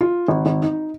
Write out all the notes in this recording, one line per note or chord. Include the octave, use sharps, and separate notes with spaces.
F4
G#1
G#1
D#4